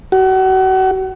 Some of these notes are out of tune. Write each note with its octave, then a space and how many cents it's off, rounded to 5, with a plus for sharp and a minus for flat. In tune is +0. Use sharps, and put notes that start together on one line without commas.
F#4 +35